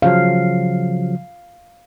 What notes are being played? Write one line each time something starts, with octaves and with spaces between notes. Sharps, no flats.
C#3 F3 F#3 F5